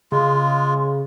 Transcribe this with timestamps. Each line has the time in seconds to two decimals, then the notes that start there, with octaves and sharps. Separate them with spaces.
0.12 C#3 G#3 F4